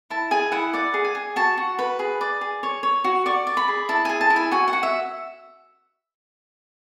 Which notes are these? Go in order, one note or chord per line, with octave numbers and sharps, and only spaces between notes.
E4 A5
G#4 G#5
E4 F#5
D5 F#5
G#4
G#5
G#4
F#4 A5
F#4
B4
G#4
D5
G#4
C#5
C#5
F#4
D5 C#6
D5
B5
G#4
E4 A5
G#4 G#5
A5
E4
G#5
F#4 G#5
F#5
F#4
E5